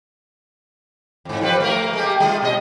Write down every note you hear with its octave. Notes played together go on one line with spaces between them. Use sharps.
F2 G#2
F3 G3 B4
A3 A#3 A#4
G#3 A#3 G4
G3 F4
B2 D#5